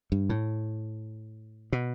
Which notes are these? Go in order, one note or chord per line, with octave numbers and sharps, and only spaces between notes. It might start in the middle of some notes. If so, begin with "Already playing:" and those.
G2
A2
B2